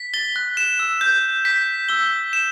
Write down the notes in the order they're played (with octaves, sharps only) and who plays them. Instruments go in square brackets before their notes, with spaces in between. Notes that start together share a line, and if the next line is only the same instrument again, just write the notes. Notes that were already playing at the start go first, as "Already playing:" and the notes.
Already playing: [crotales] B6
[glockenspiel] A6 [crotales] G7
[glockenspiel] F#6
[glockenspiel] F#6 [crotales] E7
[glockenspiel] E6
[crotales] G6
B6
[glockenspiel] E6 [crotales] G7
[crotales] E7